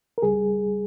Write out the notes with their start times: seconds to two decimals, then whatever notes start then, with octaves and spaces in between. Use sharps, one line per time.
0.18 A#4
0.22 C#2 C#3 G3 G#4